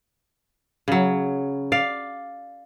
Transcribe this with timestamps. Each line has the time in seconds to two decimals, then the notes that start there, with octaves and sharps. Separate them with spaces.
0.88 C#3 F#3
1.72 D5 F5